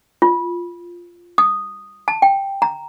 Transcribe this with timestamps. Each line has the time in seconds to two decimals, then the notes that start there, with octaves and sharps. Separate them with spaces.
0.22 F4
1.38 D#6
2.08 A5
2.22 G5
2.62 A#5